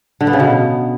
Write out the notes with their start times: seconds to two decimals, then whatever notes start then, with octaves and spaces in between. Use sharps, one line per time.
0.21 D3
0.27 B3
0.33 C#3
0.40 B2